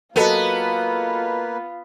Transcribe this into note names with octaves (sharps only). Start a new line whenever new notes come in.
F#3 A#3 B3 F4 A4 B4 D#5